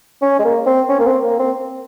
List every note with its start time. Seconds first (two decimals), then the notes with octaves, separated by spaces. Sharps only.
0.22 C#4
0.39 G#3
0.44 A#3
0.66 C4
0.89 C#4
0.99 A#3
1.06 C4
1.23 A#3
1.39 C4